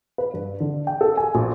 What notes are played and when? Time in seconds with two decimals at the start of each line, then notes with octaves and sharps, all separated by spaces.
0.18 B4
0.34 G2
0.60 D3
0.87 G5
1.01 A4
1.17 G#5
1.35 A#1